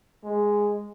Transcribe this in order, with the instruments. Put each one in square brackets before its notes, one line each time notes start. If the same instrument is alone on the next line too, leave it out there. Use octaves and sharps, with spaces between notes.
[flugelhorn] G#3